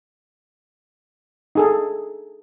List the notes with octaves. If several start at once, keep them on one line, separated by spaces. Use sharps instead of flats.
D#4 G#4 A4